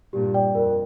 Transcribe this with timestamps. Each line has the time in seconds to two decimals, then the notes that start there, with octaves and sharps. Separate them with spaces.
0.13 G2 A#2 G4
0.34 D5 G5
0.55 F2 A#4